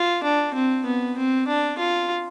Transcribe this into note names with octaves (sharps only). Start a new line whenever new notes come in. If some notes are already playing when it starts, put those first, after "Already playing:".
Already playing: F4
D4
C4
B3
C4
D4
F4